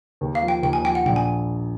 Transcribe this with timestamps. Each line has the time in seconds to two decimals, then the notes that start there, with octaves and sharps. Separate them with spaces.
0.21 D#2
0.35 F5
0.42 F3
0.48 G5
0.62 D#2 G5
0.73 G#5
0.84 F3 G5
0.95 F#5
1.05 A#1 G5
1.16 G#5